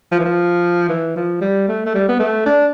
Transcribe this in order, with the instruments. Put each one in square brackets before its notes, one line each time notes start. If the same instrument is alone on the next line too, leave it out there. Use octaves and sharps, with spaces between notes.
[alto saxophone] F3
E3
F3
E3
F3
G3
A3
A3
G3
B3
A3
D4